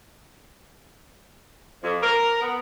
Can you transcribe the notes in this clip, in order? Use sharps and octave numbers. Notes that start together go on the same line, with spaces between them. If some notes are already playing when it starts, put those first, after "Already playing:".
F2
A#4
B3